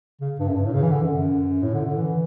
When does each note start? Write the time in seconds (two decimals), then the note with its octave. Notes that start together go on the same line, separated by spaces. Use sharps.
0.21 C#3
0.39 G2
0.48 F#2
0.56 G2
0.65 A2
0.74 C#3
0.83 E3
0.91 D3
1.03 F#2
1.15 F#2
1.62 A2
1.74 D3
1.85 D3
1.97 E3